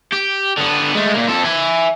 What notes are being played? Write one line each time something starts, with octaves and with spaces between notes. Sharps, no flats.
G4
D3 B3
G#3 A3
A#2 A#3
F2 A4
E5 G#5